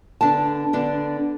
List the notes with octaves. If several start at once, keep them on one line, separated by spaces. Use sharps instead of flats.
D3 B3 D4 A5
D3 B3 D4